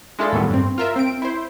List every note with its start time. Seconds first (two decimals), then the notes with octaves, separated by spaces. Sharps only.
0.19 G#3 D4 E4 F4 A4
0.32 D#2 A2 E3 F#3 G3 B3
0.50 G2 C4
0.78 F4 A#4 E5
0.96 C4 D7
1.22 E4 C5